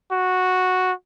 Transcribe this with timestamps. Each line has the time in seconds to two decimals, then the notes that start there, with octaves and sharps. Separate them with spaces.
0.12 F#4